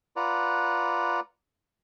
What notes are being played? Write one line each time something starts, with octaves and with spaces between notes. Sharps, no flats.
F4 B4 D5 F#5 A#5